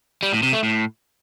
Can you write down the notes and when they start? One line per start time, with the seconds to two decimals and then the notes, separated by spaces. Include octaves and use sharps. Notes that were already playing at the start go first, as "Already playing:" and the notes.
0.23 G3
0.33 A2
0.43 C3
0.53 A3
0.63 A2